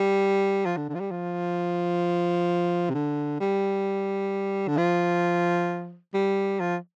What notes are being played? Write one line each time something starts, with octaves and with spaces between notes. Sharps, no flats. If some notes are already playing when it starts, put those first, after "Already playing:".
Already playing: G3
F3
D3
D3
F3
G3
F3
C3
D3
G3
D3
F3
G3
F3